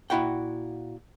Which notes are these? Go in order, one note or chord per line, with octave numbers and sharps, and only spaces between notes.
A#2 A#3 E4 F#4 F#5 G5